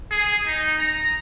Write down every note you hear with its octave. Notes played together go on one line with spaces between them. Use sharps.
G#4
D#4
A#5